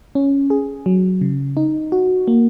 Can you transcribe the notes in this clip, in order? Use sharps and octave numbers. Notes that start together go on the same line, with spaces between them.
C#4
G#4
F#3
C#3
D#4
F#4
A#3